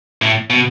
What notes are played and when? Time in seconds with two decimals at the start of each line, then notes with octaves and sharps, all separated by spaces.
0.22 A2
0.50 B2